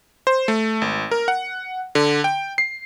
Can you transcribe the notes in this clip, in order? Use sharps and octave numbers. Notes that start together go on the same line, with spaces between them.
C5
A3
G#1
A#4
F#5
D3
G5
C7